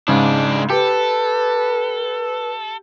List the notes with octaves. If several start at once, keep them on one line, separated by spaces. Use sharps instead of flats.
G#2 C#3 G#3 D4
G4 A4 B4